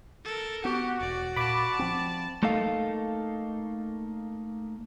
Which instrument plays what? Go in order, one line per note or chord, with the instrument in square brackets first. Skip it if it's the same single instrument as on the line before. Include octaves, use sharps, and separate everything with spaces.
[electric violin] A4 A#4
[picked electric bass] B3 [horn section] F#4 [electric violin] G4
[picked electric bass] E1 [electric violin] D5
[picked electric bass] A#2 [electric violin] D5 A5 [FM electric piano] B5 D6
[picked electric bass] F3 C4
[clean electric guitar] A3 A#3 D#4 A4 F5